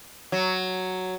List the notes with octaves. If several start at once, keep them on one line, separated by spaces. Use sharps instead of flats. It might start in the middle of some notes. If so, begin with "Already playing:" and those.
F#3